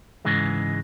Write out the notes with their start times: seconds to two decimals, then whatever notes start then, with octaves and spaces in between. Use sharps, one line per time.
0.25 G#2 C#3 E3 G#3